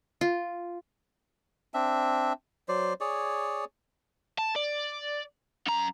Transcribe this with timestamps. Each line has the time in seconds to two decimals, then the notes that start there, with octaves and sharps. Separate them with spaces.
0.21 F4
1.74 C4 D4 E5
2.69 F#3 C5 D5
3.01 G#4 C#5 D5
4.38 A5
4.56 D5
5.67 F#2 A#5